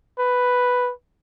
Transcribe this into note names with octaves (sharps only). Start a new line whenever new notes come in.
B4